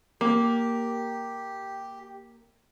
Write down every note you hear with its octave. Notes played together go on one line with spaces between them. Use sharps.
A#3 G4